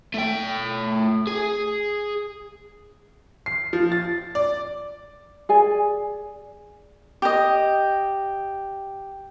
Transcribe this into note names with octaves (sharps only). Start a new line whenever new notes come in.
A3 G5
G#4
C7
F3
A6
D5
G#4 D5 G#5
G4 D#5